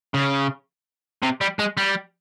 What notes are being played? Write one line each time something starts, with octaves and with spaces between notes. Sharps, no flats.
C#3
C3
G3
G#3
G3